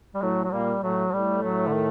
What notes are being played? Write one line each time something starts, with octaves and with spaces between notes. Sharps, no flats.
G3
A2 F#3 A3
F#3
A#2 G3 A#3
A2 F#3 A3
A2 G3 A3
F#3
D3
D#3